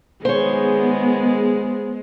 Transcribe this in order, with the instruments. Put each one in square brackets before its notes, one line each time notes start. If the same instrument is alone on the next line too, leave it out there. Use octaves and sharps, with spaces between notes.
[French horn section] D#3 G#4 [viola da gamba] G#3 [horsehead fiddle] B3 [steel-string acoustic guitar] C5 C#5